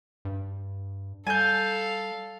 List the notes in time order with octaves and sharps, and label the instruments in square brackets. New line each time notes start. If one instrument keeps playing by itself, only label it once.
[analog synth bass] G2
[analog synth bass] G3 [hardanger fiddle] A4 F5 [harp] G#5 G6